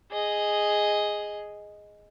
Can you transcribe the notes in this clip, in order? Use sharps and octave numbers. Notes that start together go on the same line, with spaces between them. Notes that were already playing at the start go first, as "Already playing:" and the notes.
G#4 D#5